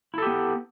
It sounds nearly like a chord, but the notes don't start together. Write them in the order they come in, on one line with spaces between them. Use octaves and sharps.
E4 A4 G4 B3